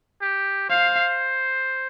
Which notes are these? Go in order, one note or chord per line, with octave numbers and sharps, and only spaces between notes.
G4
C5 F5